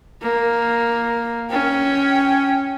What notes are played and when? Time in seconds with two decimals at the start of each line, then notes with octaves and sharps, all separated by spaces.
0.22 A#3
1.50 C#4 G5